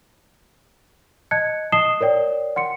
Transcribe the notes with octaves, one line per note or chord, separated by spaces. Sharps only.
D#5 A5 F#6 G#6 C#7
D#5 A5 D#6 C7 E7 G7
A#4 C#5 D5 G5
F#5 C6 C#7